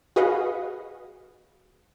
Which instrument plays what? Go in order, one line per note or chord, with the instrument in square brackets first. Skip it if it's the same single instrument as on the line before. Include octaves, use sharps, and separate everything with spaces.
[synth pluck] F#4 G#4 B4 D#5 F5 F#5